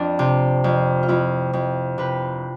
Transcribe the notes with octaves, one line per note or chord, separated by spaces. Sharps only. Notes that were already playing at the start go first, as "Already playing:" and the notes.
Already playing: F2 C4 D4
C3
F2
F4
F2 E4
F2
C3 B4